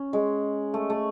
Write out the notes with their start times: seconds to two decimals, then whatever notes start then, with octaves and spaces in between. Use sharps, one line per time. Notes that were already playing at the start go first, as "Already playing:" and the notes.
Already playing: C#4
0.13 G#3
0.74 A3
0.90 A3